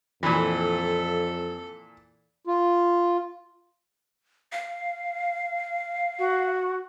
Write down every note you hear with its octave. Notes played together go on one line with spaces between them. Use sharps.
F2 A#2 E3 A4
F4
F5
F#4